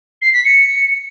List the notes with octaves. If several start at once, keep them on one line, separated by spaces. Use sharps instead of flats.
C7
B6
C#7